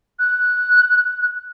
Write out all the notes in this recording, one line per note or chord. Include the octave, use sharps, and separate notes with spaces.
F#6